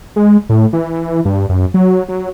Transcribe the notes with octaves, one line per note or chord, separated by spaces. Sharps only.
G#3
A2
E3
G2
F#2
F#3
F#3